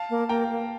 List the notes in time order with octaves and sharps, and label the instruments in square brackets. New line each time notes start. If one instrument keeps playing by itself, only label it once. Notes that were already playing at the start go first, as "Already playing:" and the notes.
Already playing: [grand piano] F5 A5
[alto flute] A#3
[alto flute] A#3 [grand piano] G5 A#5
[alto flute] A#3